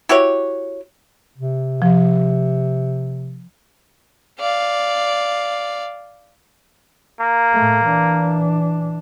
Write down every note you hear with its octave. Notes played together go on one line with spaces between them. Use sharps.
E4 F#4 G4 C#5
C3
C3 F3
D5 F5
A#3
A2 A3
E3 D4